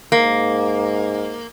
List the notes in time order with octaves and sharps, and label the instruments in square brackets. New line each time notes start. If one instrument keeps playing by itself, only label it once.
[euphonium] G#2 [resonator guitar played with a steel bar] A#3